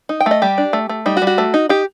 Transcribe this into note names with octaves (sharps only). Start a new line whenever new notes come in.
D#4
G5
A3 D#5
G3 G4
D4
A3
A3
G3 D#4
F#4
G3
F#4
A3
D#4
D#4 G4